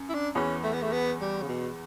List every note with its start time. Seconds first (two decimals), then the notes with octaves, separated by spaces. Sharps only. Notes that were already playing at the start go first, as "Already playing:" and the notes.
Already playing: F#2
0.09 E4
0.14 D4
0.35 E2 E3 C#4
0.64 A3
0.73 B3
0.82 A3
0.92 B3
1.21 G3
1.42 C#3
1.48 B2